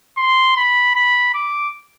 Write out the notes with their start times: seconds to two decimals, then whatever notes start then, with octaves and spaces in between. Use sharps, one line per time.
0.17 C6
0.56 B5
0.95 B5
1.34 D6